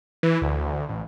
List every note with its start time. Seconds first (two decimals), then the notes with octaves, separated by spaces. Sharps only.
0.23 E3
0.42 D2
0.89 A1